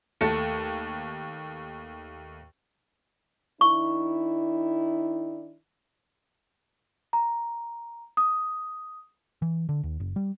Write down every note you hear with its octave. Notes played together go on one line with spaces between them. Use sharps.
D#2 A3 A5 C#7
D#3 D4 E4 C#6
A#5
D#6
E3
D3
D#2
F#1
G3